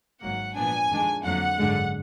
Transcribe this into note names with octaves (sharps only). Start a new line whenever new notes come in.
G#1 G#2 F#3 A#3 F#5
A#2 F3 B3 D4 G#5
F2 D#3 G#3 D4
F2 D3 F#3 A#3 F#5
G#1 F#2 D3 G#3